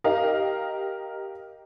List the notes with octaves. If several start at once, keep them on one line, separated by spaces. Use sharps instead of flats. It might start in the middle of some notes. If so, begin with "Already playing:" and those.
G4 A#4 D#5 F5